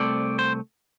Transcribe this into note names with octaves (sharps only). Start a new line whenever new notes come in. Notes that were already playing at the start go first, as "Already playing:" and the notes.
Already playing: C2 A3 C4 D5
C5